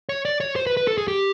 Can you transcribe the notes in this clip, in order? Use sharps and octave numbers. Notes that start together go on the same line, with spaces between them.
C#5
D5
C#5
C5
B4
B4
A4
G#4
G4